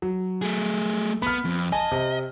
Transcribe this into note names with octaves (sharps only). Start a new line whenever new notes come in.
F#3
A3 G#4
B3 B5 F6
F2
D#5 G#5 A5
C3